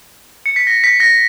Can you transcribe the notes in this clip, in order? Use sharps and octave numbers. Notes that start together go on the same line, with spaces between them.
C#7
B6
A#6
B6
A#6